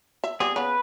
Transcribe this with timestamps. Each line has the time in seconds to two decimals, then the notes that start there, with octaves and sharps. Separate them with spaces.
0.24 E5
0.40 G3 B3 C4 G#4
0.56 C#3 B3 B4